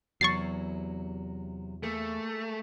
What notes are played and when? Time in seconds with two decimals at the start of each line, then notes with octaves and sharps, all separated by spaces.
0.21 E2 C3 F#3 F#4 C#6 A6 C7
1.83 A3 A#3 G#4